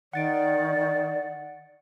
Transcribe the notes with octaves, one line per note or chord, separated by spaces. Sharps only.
D#3 D5 F#5 A6 D7